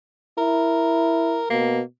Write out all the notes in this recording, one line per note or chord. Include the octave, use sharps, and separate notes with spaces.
E4 A#4
B2 A#3